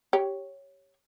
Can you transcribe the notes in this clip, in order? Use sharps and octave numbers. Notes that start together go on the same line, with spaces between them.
G4 C#5